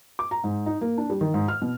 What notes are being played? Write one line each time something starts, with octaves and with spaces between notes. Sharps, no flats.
D6
A#5
G#2
D#4
A#3
D4
G3
D#3
G#2
F6
B2